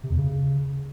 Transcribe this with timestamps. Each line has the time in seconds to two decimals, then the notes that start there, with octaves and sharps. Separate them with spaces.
0.03 C3
0.11 E2
0.18 C#3